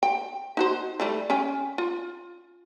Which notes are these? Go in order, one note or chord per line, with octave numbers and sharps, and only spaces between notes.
G5
D#4 F#4 C5
E3 G3 A3
C#4 G5 G#5
F4